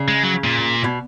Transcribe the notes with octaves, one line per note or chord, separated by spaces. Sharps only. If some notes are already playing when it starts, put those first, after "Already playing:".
Already playing: C#3
G#3
F#3
A#2
B2